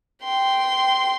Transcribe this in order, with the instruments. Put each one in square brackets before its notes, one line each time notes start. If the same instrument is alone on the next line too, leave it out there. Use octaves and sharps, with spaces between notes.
[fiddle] G5 C6